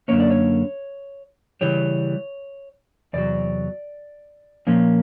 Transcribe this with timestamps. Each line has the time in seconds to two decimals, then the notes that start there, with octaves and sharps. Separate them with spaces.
0.08 F#2 D3 F3 A#3 C#4 C#5
0.20 D5
0.31 C#5
1.61 C#3 E3 G3 C#5
3.13 E2 C3 F#3 D5
4.67 A#2 F3 A#3 C#4